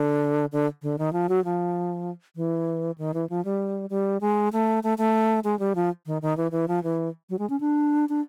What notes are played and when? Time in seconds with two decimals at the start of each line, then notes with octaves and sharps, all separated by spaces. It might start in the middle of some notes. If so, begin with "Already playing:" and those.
Already playing: D3
0.52 D3
0.82 D3
0.98 D#3
1.13 F3
1.29 F#3
1.45 F3
2.36 E3
2.98 D#3
3.14 E3
3.30 F3
3.45 G3
3.90 G3
4.21 G#3
4.53 A3
4.83 A3
4.98 A3
5.44 G#3
5.59 G3
5.75 F3
6.06 D#3
6.22 D#3
6.37 E3
6.51 E3
6.68 F3
6.83 E3
7.30 F#3
7.39 G#3
7.50 C#4
7.60 D4
8.09 D4